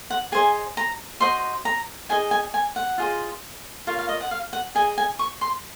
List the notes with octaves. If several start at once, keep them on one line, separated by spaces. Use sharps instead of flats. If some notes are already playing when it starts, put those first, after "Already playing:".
F#5
G#4 C5 D#5 G#5
A#5
F#4 C5 D#5 C6
A#5
D#4 G#4 D#5 G#5
G#5
G#5
F#5
F4 G#4 C5 D#5
F4 A#4 C#5 F5
F5
D#5
F#5
F5
F#5
G#4 D#5 G#5
G#5
C#6
C6